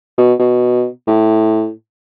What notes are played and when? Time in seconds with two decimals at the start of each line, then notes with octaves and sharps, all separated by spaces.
0.18 B2
0.39 B2
1.07 A2